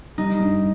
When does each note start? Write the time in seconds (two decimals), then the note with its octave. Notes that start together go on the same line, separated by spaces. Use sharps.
0.18 G3 D#4
0.40 G2